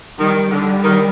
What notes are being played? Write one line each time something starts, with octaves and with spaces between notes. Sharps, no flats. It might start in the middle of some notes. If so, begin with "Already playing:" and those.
D#3 G3
D3 G3
D#3